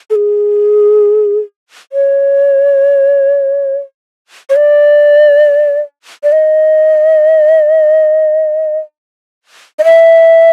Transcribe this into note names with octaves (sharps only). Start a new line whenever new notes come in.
A4
G#4
C#5
C#5
D5
D5
D#5
D#5
E5